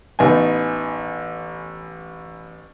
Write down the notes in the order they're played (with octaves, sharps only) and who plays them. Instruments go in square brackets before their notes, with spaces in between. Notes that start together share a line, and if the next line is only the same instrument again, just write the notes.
[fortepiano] A1 B3 D#4 G#5